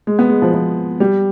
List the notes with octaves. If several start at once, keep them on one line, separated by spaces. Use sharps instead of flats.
G#3
B3
G#3
F3
F3
G3